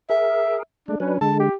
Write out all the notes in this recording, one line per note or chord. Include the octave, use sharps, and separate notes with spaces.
G#4 A#4 E5
G#3 A3 D4
F#3 C#4 D4 B4
D3 G#3 A5
G4